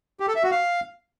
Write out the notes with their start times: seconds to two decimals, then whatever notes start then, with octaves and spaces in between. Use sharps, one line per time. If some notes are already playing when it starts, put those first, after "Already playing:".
0.20 G4
0.28 A4
0.36 E5
0.43 F#4
0.51 F5